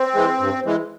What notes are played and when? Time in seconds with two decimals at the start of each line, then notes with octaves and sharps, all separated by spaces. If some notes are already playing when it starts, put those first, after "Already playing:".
Already playing: C4
0.15 E3 G#3
0.40 G2
0.66 E3 G#3